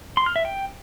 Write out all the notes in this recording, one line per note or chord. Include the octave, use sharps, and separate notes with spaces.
C6
F6
E5
G5